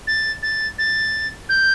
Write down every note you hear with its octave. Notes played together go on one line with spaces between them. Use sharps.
A6
A6
A6
G6